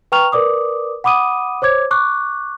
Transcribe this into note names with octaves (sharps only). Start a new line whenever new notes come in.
B4 G5 A#5 C#6 F6 F7
A#4 B4 D5 D6 D#6
F#5 B5 D6 D#6 D#7
C5 C#5 D6 G#6
C#6 D6 F#6